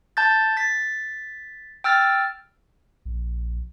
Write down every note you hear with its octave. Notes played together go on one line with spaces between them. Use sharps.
A5 G6 A6
A6 B6
G5 E6 F6 A6
A#1